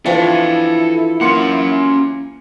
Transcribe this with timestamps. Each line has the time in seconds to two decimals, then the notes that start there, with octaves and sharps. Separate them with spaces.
0.06 E3 F3 D4 E4 A4 G5
1.21 A#3 C#4 F#5 C6 C#7